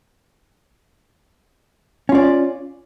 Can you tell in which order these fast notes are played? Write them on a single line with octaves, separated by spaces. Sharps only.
C#4 F4 D5